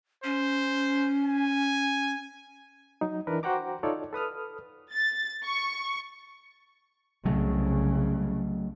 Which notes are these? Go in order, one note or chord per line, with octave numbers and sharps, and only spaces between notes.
C#4 C5
G#5
F#3 D#4
E3 D4 A#4 B4
F#4 C5 F#5 G5 A#5 D6
D#4 F4 A4 C#5 D5
A4 B4 D#6 F6
A6
C#6
C2 C#3 F#3 A3